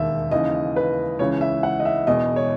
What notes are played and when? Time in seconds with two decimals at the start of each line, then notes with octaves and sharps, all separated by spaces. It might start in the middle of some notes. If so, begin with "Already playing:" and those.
Already playing: E1 D#2 D#3 E5
0.31 D#2 C#3 E3 D#5
0.76 B4
1.19 C#2 C#3 E3 C#5
1.41 E5
1.63 F#5
1.80 D#5
1.85 E5
2.07 E1 E2 B2 D#5
2.36 C#5